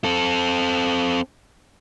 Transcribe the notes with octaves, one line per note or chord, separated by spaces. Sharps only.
C4 A4